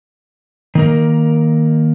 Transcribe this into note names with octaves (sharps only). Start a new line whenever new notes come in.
D#3 A#3 A#4